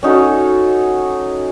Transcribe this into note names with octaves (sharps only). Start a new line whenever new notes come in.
C#4 D#4 F#4 A4